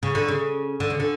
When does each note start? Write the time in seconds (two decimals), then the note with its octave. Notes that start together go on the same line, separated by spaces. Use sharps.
0.03 C#3
0.15 D3
0.28 C#3
0.80 D3
0.90 C#3
1.00 D3